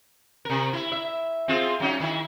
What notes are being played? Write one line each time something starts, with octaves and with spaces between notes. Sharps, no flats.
C3 A#4
E4
E5
C4 F4 G#4
F#3 C#4 D#4
D#3 E4